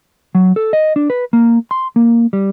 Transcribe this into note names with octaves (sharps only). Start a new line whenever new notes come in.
F#3
A4
D#5
D4
B4
A#3
C6
A#3
G3